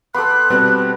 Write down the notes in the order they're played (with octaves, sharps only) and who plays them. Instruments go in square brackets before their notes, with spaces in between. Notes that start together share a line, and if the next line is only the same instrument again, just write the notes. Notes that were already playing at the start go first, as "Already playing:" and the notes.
[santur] B3 A4 [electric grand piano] B5 C6 D6 [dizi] F#6
[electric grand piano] B2 G3 C4 [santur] B4 D5